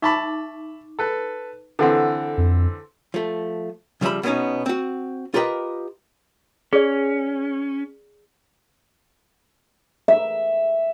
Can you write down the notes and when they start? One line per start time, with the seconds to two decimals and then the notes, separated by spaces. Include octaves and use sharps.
0.02 D#4 E5 A5 B5 C#6 D6
0.99 A4 B4
1.79 D3 E3 C4 A4 F#5
2.37 F2
3.14 F3 A3
4.01 C#3 F3 G3 E5 B5
4.23 B2 A#3 B3 C#4 D#4
4.66 C4 F#4
5.34 F4 G4 A#4 B4 D#5 G5
6.73 C#4 G#4 D5
10.08 E5